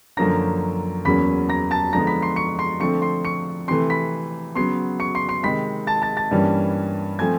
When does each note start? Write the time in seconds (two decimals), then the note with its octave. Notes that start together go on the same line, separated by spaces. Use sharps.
0.17 F#2 D3 F3 A#3 C#4 A#5 A#6
1.05 E2 C#3 F#3 A#3 C#4 B5 B6
1.49 A#5 A#6
1.71 A5 A6
1.93 D3 F3 G#3 B3 A#5 A#6
2.07 B5 B6
2.22 C6 C7
2.36 C#6 C#7
2.59 C6 C7
2.80 D3 F3 A3 C4 C#6 C#7
3.02 C6 C7
3.25 C#6 C#7
3.68 C3 E3 A3 C6 C7
3.90 B5 B6
4.55 C#3 F#3 B3 C6 C7
5.00 C#6 C#7
5.15 C6 C7
5.29 C6 C7
5.43 C3 D#3 G#3 C4 B5 B6
5.87 A5 A6
6.02 A5 A6
6.17 A5 A6
6.31 G2 E3 G3 A#3 C#4
7.19 F3 A3 C4 G#5 G#6